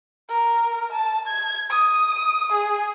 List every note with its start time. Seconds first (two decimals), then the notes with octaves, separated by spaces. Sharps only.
0.29 A#4
0.92 A5
1.27 G#6
1.70 D#6
2.52 G#4